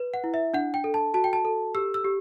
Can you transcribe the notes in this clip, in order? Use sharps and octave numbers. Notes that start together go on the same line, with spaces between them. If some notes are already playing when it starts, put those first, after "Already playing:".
Already playing: B4
F#5
E4
E5
D4 F#5
G5
A4
A5
F#4 A5
G5
A5
A4
G4 E6
E6
G4